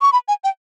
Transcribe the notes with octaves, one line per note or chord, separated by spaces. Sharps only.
C#6
B5
G#5
G5